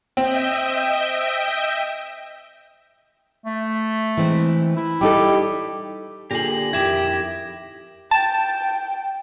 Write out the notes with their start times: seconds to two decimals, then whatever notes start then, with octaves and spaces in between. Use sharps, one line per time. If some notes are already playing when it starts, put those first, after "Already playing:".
0.17 C4 D#5 E5 G5
3.45 A3
4.17 E3 G#3 C4
4.77 E4
5.01 G3 D#4 G4 A4
6.31 A#2 D3 G4 G#4 A#6 F#7
6.73 F2 D#3 E4 G4 G#6 E7
8.11 G5 A5